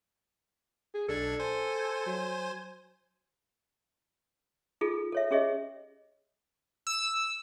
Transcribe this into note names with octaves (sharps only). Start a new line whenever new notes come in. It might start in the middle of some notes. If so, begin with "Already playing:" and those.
G#4
B1 D4 A4 G#6
C5 G#5
F#3
D#4 F4 G#4 A4
A4 C#5 E5
C#4 G4 G#4 C#5 D#5 E5
E6